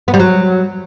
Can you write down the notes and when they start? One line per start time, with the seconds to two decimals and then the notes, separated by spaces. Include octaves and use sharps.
0.08 B3
0.14 G3
0.20 F#3